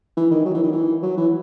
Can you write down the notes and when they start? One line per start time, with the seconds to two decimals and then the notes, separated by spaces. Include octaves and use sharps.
0.17 E3
0.31 D#3
0.45 F#3
0.54 E3
0.63 D#3
0.72 E3
1.03 F#3
1.17 E3